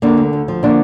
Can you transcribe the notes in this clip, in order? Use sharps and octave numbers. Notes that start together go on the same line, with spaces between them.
D3 A#3 D4
D2
D2
F3
D3 A#3 D4